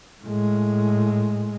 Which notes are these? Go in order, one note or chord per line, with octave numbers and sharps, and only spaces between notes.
A2 G#3